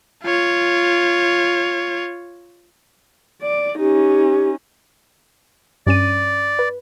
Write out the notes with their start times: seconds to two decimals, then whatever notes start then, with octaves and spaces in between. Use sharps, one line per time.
0.24 F4 C#5
3.42 D5
3.79 C#4 D#4 G4
5.87 G2 C#4 D5 D#7
6.59 B4